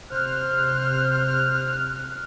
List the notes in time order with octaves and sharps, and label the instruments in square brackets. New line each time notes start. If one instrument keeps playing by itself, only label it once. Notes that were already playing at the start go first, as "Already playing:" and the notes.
[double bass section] C3 [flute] C5 [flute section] F6 F#6